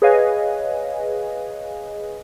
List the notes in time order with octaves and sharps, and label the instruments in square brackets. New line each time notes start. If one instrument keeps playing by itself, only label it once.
[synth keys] G#4 B4 C#5 D#5 F5 G#5